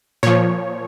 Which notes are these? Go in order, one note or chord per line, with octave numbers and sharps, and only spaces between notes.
A#2 F3 C#5